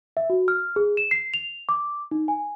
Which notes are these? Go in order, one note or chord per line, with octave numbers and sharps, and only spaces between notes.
E5
F#4
F6
G#4
E7
C7
F7
D6
D#4
G#5